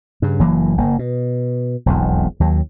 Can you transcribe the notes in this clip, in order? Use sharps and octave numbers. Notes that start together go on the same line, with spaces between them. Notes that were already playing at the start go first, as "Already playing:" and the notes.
G2 C#3
F#1 E3 F#3 A#3
F#1 A#3
B2
E1 B1 F2
D#2 F#3